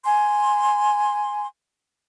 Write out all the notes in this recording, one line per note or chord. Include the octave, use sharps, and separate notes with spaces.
G#5 C6